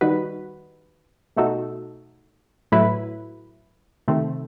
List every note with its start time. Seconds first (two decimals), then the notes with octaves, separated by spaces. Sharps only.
0.01 D#3 G3 D#4 F#4 B4
1.36 B2 A3 D#4 F#4 A4
2.72 A2 F#3 A3 E4 B4
4.08 C3 D#3 A3 C4